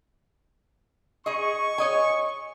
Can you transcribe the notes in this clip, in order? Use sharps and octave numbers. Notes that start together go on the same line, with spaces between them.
G#4 D#5 C#6
C#5 D#5 G#5